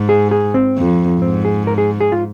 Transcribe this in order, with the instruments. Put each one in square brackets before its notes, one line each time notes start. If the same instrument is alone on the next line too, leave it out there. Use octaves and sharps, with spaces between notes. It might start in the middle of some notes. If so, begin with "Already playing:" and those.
Already playing: [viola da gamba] G#2
[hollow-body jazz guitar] G#4
G#4
C4
[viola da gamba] F2
[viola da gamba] G#2 [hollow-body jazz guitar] C4
[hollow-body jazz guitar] G#4
A#4
G#4
G#4
F4